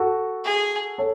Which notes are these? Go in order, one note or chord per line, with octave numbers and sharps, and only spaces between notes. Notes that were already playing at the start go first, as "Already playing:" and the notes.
Already playing: F#4 A4
G#4
A4 C#5